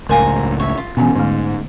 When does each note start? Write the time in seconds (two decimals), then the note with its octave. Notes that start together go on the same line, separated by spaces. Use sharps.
0.09 C#2 A2 A#4 C5 F5 G#5 A#5
0.60 C#5 E5
0.78 F4
0.97 B2 E3 B3 C#4 G#5
1.15 G#2 D3 A3